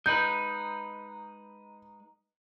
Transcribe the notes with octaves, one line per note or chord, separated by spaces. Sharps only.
G#3 D#4 B4 G6